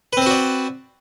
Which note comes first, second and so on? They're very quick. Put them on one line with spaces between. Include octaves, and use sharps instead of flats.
B4 C4 C5 F#4 D5